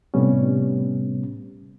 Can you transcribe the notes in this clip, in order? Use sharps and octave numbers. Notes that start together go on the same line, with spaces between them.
A2 C3 G3 B3 C#4